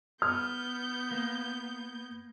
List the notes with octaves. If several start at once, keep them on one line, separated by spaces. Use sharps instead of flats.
B3 F6 G6
A#3